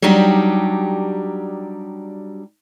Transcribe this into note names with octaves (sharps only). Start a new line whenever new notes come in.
F#3 G3 D4 D#4 G4